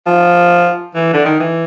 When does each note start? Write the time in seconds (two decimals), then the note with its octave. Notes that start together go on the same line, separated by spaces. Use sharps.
0.07 F3
0.95 E3
1.13 D3
1.25 D#3
1.40 E3